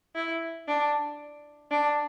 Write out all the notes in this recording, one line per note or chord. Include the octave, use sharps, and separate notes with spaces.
E4
D4
D4